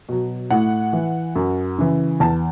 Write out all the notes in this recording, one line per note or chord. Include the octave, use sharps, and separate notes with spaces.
B2 F#3
A2 F#5
E3
F#2
C#3 E3
E2 A5